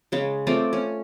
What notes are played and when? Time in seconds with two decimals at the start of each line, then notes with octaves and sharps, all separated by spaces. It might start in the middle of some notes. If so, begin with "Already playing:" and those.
0.12 C#3 G#3
0.47 A3 C4 F4 D5
0.73 C#4